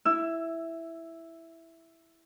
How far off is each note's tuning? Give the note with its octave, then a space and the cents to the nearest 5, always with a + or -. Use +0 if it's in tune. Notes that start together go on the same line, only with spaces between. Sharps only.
E4 +0 E6 +15